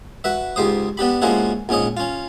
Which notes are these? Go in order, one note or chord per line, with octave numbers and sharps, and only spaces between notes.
F#4 B4 E5
C#2 G#2 G4 C5 D#6
B3 D4 G4 B5
F3 G#3 A#3 C#4 E4 F#4
A#1 G#2 C#4 C#5 D#5
C#4 F4